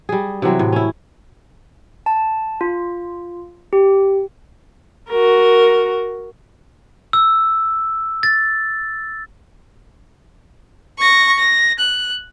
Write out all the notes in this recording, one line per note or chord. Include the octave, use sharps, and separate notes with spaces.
G3 G#4
C3 E3 F#3 C4
A2
C#4 E4
A5
F4
G4
F#4 A#4
E6
A6
C#6 A#6
A#6
F#6